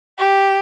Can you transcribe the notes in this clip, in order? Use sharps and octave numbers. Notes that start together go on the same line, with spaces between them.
G4